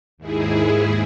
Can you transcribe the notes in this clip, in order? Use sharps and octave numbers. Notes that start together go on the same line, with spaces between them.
D#2 G#2 E4 G#4